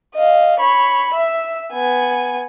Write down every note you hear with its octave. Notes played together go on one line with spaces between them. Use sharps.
D#5 F5
C#5 B5
E5
B3 G#5